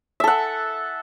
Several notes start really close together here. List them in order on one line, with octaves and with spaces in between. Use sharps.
E5 A4 F#5